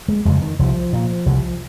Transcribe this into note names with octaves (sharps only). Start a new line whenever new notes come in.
G#3
F2 C#3 G#3
D#3
C2 F3
A#2
C2